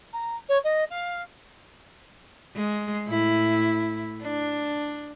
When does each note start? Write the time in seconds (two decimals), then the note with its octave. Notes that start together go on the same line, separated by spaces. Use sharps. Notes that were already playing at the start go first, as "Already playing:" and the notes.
0.13 A#5
0.49 C#5
0.64 D#5
0.90 F5
2.56 G#3
3.07 A2 E4
4.22 D4